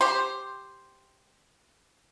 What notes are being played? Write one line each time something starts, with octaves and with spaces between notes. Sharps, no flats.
G4 C5